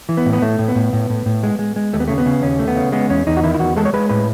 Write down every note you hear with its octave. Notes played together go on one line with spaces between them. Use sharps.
E3
B3
A2
B3
A2 A3
A2
B3
A2
A2
A2
A2
G#3
G#3
G#3
D#2 A3
B3
C#3 A3
B3
C#3
D#2 C#4
A3
B3
C#3
G#3 B3
E2 C#4
E2 D#4
F#4
D#3 E4
E4
E2 F#4
G#3 A4
C#5
G#3 B4
A2 B4